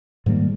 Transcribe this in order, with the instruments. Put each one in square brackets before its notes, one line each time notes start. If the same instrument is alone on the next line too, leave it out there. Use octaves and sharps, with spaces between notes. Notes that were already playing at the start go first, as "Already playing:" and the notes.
[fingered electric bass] G#2 D#3 G3 A#3